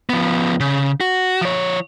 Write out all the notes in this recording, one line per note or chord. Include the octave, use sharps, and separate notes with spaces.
F3 B3
C#3
F#4
F3 C#5